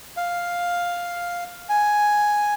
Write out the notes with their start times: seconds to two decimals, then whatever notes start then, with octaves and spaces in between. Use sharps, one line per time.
0.17 F5
1.69 G#5